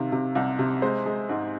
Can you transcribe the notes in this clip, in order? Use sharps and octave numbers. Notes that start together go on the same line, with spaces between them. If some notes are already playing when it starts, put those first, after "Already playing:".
Already playing: C3 D#3 F5
C3
C2
C3
G#3 C5
G#3
G#2